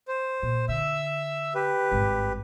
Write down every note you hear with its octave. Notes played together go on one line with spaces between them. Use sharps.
C5
A#2
D3 E5 E6
G4 B4
G#1 G2